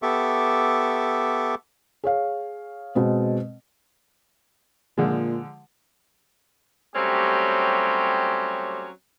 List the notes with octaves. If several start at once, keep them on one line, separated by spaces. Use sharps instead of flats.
B3 G4 A4 E5 C#6 D6
G#4 C#5 F5
B2 G#3 C4
A#2 D3 F3 G#3
F#3 G3 A3 C4 C#4 G4